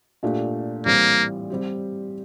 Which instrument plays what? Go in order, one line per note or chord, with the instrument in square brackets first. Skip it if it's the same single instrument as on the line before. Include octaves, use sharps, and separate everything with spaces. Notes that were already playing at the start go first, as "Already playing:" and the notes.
[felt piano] A#2 A3 D4 G4
[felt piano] A2 E3 G3 C4 [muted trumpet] A#3
[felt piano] G3 C4 G4